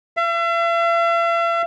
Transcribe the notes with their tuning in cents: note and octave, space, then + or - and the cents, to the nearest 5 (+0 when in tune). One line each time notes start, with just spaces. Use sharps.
E5 +45